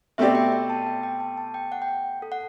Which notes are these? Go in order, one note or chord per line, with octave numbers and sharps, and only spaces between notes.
B2 A3 C4 G4 D5 E5
G5
G5
A5
G5
G5
A5
A5
G5
F#5
G5
F#5
A4
F#5